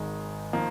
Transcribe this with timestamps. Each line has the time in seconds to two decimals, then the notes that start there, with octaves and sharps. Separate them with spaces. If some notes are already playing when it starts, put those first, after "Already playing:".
Already playing: G#1 G#2 D#3 G#3
0.53 D#3 F3 A#3